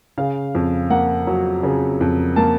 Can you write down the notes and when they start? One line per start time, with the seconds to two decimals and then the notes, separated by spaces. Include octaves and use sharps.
0.18 C#3 F5
0.55 F2
0.90 A#3 F#5
1.27 F#3
1.63 C#3
2.01 F2
2.36 A#3 A5